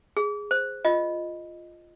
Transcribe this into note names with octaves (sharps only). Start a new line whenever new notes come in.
G#4
C5
F4 D#5